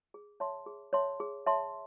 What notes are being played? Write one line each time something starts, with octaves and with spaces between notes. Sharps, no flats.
G#4
C#5 E5 A5 C6
G#4
C#5 E5 A5 C6
G#4
C#5 E5 A5 C6